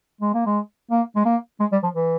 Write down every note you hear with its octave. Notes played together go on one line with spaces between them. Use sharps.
G#3
A#3
G#3
A#3
G#3
A#3
G#3
G3
F3
E3